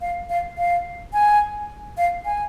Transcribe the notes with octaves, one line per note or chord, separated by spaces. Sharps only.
F5
F5
F5
G#5
F5
G#5